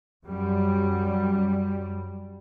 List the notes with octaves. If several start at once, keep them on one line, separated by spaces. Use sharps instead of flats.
F#2 G3